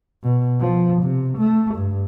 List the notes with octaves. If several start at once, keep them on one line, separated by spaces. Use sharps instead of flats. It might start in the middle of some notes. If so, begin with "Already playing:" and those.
B2
F3
C3
A3
G2